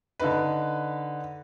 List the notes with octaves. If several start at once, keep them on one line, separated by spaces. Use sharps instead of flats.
D3 D#4 B4